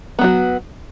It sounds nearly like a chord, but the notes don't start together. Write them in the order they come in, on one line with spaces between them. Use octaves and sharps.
B3 F#3 F#4